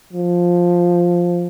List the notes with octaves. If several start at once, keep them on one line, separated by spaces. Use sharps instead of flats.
F3